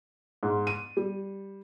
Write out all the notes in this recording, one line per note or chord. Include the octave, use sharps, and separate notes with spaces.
G#2
D#7
G3